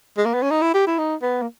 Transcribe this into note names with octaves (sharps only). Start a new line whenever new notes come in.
G#3
A#3
B3
C#4
D#4
E4
G4
E4
D#4
B3
A#3